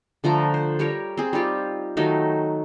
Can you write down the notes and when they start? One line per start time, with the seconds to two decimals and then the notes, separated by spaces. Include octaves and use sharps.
0.24 D3 F3 A3 A#5
0.54 C5
0.79 G3 G4 A#4 C#5
1.17 C4 G#4
1.33 G3 D#4 F4 G4
1.97 D#3 F#3 A3 D#4